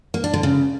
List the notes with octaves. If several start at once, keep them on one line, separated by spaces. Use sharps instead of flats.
A#3
D4
D3
C#3